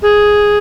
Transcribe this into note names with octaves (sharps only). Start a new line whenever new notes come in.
G#4